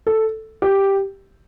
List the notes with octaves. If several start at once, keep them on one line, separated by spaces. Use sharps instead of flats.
A4
G4